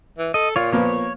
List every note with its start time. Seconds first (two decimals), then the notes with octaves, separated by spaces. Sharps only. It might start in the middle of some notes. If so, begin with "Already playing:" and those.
0.18 E3
0.34 A4 D#5
0.56 A#2 F4 C#5
0.73 F3 A#3 B3 C#5